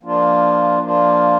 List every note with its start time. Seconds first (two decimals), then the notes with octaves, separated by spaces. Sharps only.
0.03 F3 A#3 D4 F4
0.81 F3 A#3 D4 F4